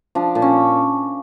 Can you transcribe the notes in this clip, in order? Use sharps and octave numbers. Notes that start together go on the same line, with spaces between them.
F3 D4
A#2
C#4